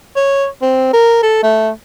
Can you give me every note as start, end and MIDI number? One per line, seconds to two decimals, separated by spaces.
0.16 0.46 73
0.62 0.92 60
0.93 1.22 70
1.23 1.41 69
1.43 1.70 57